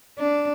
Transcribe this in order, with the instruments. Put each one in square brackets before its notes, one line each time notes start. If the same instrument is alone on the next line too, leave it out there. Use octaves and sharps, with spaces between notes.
[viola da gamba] D4